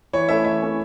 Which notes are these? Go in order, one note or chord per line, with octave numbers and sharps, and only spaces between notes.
E3 C#5
A3 C#4 E4 E5
E3 E5
A3 C#4 E4